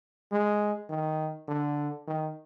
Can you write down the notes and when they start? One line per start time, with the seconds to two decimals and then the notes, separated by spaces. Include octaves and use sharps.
0.32 G#3
0.90 D#3
1.48 D3
2.08 D#3